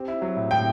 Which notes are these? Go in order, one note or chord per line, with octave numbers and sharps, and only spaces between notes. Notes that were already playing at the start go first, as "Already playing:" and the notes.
Already playing: C4 G4
E4
F#3
A2
A2 G5